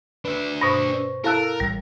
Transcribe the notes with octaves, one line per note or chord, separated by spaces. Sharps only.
D4 B4 E5
G2 B2 C5 C#6 A#6
E4 A4 A#4 F5 A5 E6 F#6
A1 G3